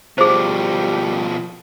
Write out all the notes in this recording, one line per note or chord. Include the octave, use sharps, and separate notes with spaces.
B2 F3 G3 G#4 C5